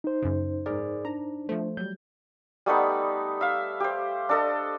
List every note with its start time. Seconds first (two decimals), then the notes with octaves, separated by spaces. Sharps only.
0.04 D#4 C5
0.22 F#2 C#3
0.66 G#2 G#4 A#4 D5
1.05 D4 A#5
1.49 F3 A3 C5
1.77 F#3 G3 G6
2.66 G3 A3 B3 D#4
3.41 E5 F5
3.80 G4 C5
4.29 D4 A4 D#5